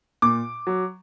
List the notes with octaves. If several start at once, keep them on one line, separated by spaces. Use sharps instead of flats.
A#2 D6
F#3